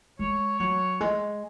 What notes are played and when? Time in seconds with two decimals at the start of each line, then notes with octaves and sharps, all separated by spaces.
0.19 G#3 C#5
0.60 F#3 C#5
1.01 G#3